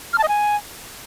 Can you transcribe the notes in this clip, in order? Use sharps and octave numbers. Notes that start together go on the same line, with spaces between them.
F6
A5
D#5
G#5